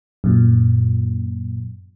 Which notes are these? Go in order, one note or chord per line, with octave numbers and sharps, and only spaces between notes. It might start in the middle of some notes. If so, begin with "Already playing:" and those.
F#2 A#2